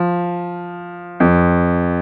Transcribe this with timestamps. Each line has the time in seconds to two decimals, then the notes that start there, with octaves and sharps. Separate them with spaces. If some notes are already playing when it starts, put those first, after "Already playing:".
Already playing: F3
1.20 F2